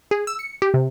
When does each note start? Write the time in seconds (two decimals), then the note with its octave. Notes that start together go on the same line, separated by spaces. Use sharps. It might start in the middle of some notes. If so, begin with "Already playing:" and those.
0.11 G#4
0.27 E6
0.39 C#7
0.62 G4
0.74 C3